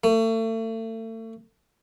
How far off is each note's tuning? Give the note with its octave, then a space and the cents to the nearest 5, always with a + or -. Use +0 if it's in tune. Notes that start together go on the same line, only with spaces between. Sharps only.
A3 +35